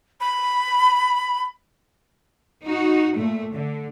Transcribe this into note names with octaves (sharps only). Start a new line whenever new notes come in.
B5
D#4 F#4
A#2 A3
D3